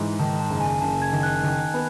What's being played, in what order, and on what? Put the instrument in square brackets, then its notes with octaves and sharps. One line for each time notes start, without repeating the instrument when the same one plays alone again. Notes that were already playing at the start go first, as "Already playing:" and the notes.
Already playing: [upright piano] G#2 E3
[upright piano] D#3 [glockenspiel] A5
[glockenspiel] A5
[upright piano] F#1
[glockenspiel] G#5
[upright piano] F#1 [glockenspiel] A5
[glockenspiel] G#6
[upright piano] D#3
[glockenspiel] F#6
[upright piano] D#3
B3